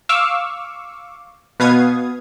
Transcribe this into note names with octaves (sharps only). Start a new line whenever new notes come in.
F5 C#6 D6 E6
B2 B3 F5 D#6 G#6